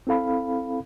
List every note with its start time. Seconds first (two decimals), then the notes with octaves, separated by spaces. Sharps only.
0.07 C4 E4 A4 F5 B5